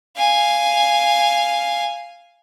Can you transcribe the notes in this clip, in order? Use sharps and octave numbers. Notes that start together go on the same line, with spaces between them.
F5 G#5